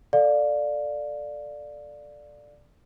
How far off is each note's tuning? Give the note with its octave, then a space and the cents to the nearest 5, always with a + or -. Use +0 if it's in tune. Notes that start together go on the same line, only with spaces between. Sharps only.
A4 +0 D5 +5 F5 +20